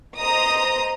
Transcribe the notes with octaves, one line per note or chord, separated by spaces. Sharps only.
C5 D#5 A#5 D#6